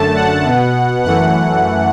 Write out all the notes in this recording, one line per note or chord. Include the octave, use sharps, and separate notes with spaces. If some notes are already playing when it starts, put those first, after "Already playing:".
Already playing: F#2 D3 A3 A5
F#5
B2 B3
F#2 E3 A3 F#5